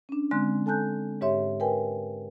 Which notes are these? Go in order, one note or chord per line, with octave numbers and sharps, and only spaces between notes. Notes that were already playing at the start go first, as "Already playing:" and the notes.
C#4 D4
D3 G#3 C4 C6 F#6
A4 G#5 A5 F#6 G6
G#2 G4 C#5 E5 C6
A#4 B4 G5 G#5